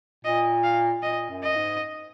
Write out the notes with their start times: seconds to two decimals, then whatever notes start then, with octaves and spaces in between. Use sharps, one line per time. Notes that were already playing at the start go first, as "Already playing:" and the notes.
0.25 A#2 D#5
0.64 F5
1.03 A#2 D#5
1.30 F#2
1.43 D#5
1.56 G#2